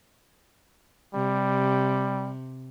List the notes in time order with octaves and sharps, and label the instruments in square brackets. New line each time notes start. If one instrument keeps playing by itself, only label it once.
[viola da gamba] C3 [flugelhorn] G3